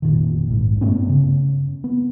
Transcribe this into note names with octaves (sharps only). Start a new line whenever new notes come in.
F1 A#2 D#3
A#1 G#2
G2 A3 B3 C#4
C#3
B3